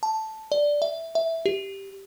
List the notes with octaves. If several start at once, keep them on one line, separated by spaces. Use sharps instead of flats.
A5
D5
E5
E5
G4